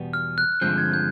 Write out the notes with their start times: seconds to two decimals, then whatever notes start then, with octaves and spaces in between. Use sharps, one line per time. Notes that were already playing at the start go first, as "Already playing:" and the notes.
Already playing: E2 B2 G3 B3
0.13 F6
0.38 F#6
0.61 G2 D3 F3 G#3 C4 G6
0.78 G#6
0.94 G6